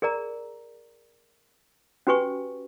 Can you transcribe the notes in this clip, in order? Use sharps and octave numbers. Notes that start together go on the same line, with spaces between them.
G#4 A#4 D5 A#5
C#4 F#4 G4 B4 G#5 C#6